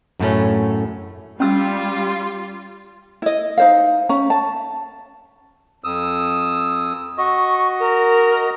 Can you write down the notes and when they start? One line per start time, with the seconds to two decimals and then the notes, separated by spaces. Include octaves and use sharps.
0.20 F#2 A2 A3 C#4
1.40 G3 C#4 F4 E6
3.22 E4 D#5
3.58 D#4 C5 F5
4.09 C#4 A#5
4.30 A5
5.84 F2 D#6 E6
7.18 F#4 D#5 C#6
7.80 A#4